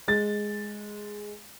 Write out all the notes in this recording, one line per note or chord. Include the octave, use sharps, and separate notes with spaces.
G#3 A6